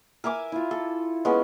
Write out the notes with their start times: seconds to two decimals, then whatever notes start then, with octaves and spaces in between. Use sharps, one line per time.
0.24 A#4 E5 G#5 D6
0.52 E4 F4
0.71 A4
1.25 G#3 B3 C#4